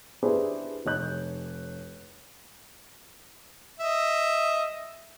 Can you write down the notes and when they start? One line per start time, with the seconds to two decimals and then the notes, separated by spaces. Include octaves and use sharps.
0.23 D4 E4 G4 G#4 B4 C5
0.85 F1 C#5 F#6 G6
3.80 D#5 E5